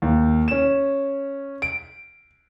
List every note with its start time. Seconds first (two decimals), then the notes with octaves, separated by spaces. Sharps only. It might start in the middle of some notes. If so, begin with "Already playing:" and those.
0.02 D#2
0.48 C#4 E7
1.62 D7